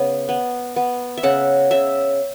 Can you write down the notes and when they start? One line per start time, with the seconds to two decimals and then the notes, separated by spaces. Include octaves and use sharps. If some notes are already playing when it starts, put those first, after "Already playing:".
Already playing: C#3 B3
0.29 B3
0.76 B3
1.17 E5
1.23 C#3 F#5
1.71 C#3 E5